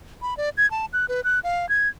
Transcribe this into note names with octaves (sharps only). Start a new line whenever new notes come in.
B5
D5
G#6
A5
F#6
B4
F#6
F5
G#6